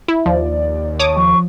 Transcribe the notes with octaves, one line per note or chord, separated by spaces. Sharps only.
E4
D#2 F3 D5
C#5 A5 D6 D#6
F3 C#6